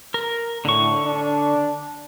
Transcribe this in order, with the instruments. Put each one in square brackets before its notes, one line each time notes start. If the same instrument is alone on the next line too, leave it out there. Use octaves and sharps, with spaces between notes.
[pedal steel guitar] A#4
[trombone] A2 [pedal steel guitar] D3 C#6
[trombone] D4